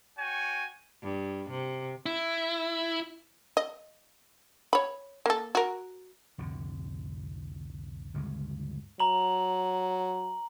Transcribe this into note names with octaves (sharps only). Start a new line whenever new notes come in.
F#4 C#5 G5 G#5
G2
C3
E4
D#5
C#5 B5
A#3 A4
F#4 A#4
C2 F2 A2 D3
D2 G2 C#3 G#3
F#3 A#5 F#7